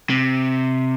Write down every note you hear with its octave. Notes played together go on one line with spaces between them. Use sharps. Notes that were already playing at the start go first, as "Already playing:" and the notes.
C3